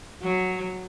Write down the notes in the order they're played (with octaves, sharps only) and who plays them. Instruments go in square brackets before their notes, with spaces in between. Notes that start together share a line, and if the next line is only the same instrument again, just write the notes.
[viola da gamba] F#3